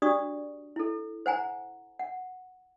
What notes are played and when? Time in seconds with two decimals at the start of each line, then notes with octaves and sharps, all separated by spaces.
0.02 D4 F#4 G4 D5 C#6 D#6
0.76 E4 A4
1.26 C5 F#5 G#5 A#5
1.99 F#5